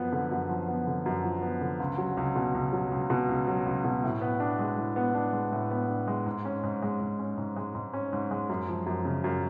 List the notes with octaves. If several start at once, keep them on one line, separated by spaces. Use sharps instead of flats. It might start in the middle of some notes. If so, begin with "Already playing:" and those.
Already playing: F#2 F3 B3
D3
F#2
F3
B3
D3
F#2
F3
B3
D3
C#2
F#3
C#2
B2
C#2
F#3
C#2
B2
C#2
F#3
C#2
B2
A2
B3
D4
G#3
A2
B3
D4
G#3
A2
B3
D4
G#3
G#2
C#4
G#2
G#3
G#2
C#4
G#2
G#3
G#2
C#4
G#2
G#3
F#2
F3
F#2
C#3
F#2